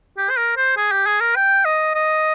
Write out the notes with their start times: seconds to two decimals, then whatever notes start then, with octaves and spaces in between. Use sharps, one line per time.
0.18 G4
0.30 C5
0.37 A#4
0.57 C5
0.77 G#4
0.92 G4
1.06 G#4
1.21 A#4
1.36 G5
1.65 D#5
1.95 D#5